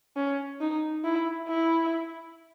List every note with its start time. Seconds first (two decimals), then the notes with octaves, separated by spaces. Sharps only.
0.16 C#4
0.60 D#4
1.04 E4
1.48 E4